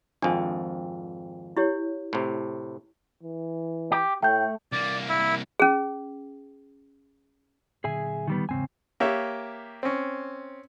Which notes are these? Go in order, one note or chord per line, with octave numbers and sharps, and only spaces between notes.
G#1 F2 D4 G#5
E4 G4 C#5
A2 C3
E3
G4
A2 A3 G5 G6
C2 A#3 D5
E4
C#4 G#4
A#2 D3 F#3 G#4 E5 G#5
D#3 G3 B3
E2 G#2 C#3 C4 G#5
A#3 G4 C#5 E5
C4 C#4